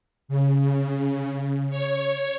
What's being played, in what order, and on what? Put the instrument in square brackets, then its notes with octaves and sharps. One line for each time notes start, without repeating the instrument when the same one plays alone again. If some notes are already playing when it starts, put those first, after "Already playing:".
[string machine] C#3
C#5